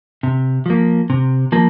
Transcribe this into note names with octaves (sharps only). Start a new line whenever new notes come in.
C3
F3 A#3
C3
F3 A#3